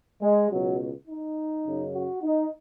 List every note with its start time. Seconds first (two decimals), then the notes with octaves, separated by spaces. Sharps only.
0.22 G#3
0.51 C#2 B2 F#3
1.08 D#4
1.66 F#2 C#3
1.95 F#4
2.23 D#4